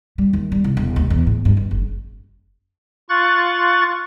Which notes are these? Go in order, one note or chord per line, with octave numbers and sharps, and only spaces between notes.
G3
D#2
G3
C2
E1
D#2
E2
A2
G2
G2
F#1
F4 C#6 F#6 A6